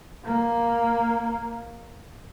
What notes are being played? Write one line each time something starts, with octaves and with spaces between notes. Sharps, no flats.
A#3